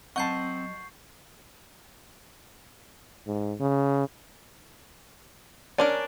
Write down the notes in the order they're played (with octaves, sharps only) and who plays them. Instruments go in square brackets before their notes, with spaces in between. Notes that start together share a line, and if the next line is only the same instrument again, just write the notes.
[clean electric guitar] F#3 D#5 [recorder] C4 [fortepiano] F#5 A5 [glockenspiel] C#6 G6 C7
[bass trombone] G#2
C#3
[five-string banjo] C#4 D4 A#4 [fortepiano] D5